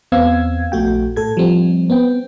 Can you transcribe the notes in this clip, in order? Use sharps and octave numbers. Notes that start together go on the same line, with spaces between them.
E2 B3 C4 F5 E6 G#6
A#1 A3 F#4 G5
A2 A4 G#6
F3 G3 C4
B3 C4 G5